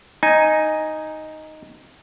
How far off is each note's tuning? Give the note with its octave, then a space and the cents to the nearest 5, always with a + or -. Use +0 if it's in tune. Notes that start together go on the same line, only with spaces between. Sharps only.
D#4 +0 G#5 +0